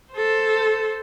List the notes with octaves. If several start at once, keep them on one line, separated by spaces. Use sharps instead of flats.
A4 C5